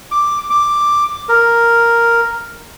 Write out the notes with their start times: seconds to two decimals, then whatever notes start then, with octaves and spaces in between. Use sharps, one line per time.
0.11 D6
0.50 D6
1.29 A#4